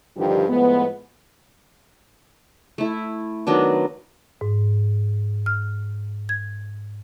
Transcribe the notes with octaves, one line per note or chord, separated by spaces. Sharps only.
G2 D3 D#3 F3 G4
A2 F3 G#3 B3
A3 E4
D#3 F#3 B3 D4
G#2
F6
G#6